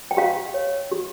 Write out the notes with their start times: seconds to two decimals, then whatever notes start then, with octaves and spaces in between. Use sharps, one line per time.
0.11 G5
0.17 G4 F5
0.54 C#5
0.91 G4